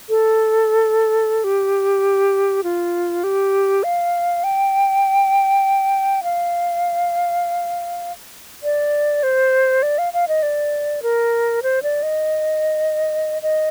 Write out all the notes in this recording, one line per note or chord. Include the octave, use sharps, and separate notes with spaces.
A4
G4
F4
G4
F5
G5
F5
D5
C5
D5
F5
F5
D#5
D5
A#4
C5
D5
D#5
D#5